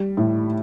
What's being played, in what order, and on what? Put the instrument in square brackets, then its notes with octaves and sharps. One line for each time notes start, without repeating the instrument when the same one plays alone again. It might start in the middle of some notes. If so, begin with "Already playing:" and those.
Already playing: [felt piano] G3
A2